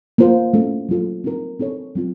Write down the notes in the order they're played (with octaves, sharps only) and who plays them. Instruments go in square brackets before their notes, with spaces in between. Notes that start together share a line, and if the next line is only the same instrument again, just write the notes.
[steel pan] A#3 F4 C5
A3 C#4 A4
F#3 A#3 F4 A4
C4 D#4 A#4
C4 D#4 A4 C#5
F#3 C4 F4